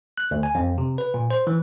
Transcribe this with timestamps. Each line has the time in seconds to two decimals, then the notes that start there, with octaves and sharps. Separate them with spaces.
0.18 F#6
0.31 D2
0.43 G#5
0.55 F2
0.78 C3
0.98 B4
1.14 A#2
1.30 C5
1.47 E3